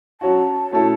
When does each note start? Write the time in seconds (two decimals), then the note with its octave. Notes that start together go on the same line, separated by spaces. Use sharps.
0.21 F#3 C#4 F#4 A5
0.71 B2 A3 C#4 E4 A4